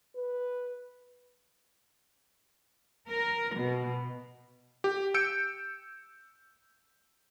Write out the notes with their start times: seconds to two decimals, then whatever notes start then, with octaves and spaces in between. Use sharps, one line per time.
0.16 B4
3.10 A#4
3.57 B2
4.84 G4
5.14 E6 G6 C#7 D7